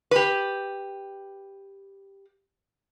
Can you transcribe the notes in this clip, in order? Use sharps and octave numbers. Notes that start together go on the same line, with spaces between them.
G4 B4